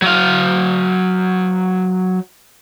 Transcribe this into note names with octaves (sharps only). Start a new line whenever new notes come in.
F#3 F5